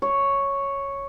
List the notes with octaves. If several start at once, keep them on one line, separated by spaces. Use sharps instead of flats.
C#5